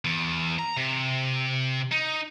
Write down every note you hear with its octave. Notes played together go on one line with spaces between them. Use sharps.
E2
A#5
C3
D#4